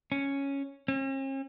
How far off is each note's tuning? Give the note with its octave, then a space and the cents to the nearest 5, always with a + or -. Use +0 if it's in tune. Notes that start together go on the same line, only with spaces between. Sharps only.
C#4 +0
C#4 -45